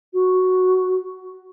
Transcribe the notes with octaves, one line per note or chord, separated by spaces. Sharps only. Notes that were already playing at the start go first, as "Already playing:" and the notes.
F#4